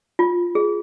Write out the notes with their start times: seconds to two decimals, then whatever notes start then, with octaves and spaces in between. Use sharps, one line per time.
0.19 F4
0.55 G#4